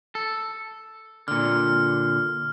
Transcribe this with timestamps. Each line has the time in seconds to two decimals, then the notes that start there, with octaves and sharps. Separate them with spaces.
0.15 A4
1.28 A#2 D3 F6